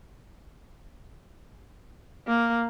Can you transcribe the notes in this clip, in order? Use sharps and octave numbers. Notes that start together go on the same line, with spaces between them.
A#3